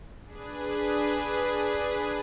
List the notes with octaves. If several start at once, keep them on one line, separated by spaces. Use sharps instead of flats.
D4 G#4 B4